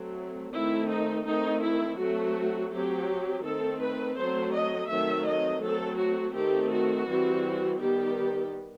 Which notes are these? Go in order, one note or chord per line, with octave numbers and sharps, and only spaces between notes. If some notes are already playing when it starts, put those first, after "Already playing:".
Already playing: F#3 A3 C4
D#3 A3 C4 E4
D#4
D#3 A3 C4 D#4
E4
F#3 A3 C4 F#4
F#3 C4 G4
D#3 A3 C4 A4
B4
F#3 A3 C4 C5
D#5
D#3 F#3 A3 C4 E5
D#5
F#3 A3 C4 A4
F#4
D#3 A3 C4 G4
F#4
E3 G3 C4
D#3 G3 B3 G4